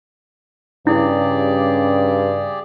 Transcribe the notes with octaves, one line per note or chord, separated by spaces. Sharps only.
G2 C#3 E4 G4 G#4 D5